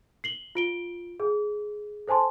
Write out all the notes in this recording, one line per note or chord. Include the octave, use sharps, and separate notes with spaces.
C7 F#7 G7
F4 D7 G7
G#4
A4 C5 G#5 A5 C6